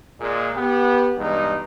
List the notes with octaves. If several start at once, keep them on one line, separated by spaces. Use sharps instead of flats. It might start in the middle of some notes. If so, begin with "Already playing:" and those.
A#2 G#3
B3 G4
E2 G2 G#3 D#4